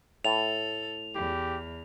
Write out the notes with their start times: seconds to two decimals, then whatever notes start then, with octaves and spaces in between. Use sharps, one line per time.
0.25 A2 A4 F7
1.15 E2 G4